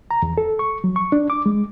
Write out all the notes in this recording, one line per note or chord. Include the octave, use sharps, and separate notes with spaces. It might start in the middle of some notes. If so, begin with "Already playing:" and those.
A#5
E2
A4
C#6
F#3
C#6
D4
D6
G#3